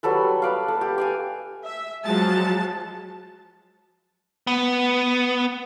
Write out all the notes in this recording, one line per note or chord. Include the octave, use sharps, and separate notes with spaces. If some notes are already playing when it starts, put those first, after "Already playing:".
F#3 G3 A4 B4
B4 D5 F5
A4
G4
D5 F5 G#5
E5
F3 F#3 G#3 A5
B3